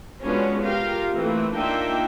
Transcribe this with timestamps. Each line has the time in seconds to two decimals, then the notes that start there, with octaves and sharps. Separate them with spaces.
0.22 G#3 B3 C#4 D4 F4 F#4
0.61 F4 G4 A#4 F5
1.11 E3 A3 A#3 C4
1.54 A#3 D4 D#4 F4 E5 G5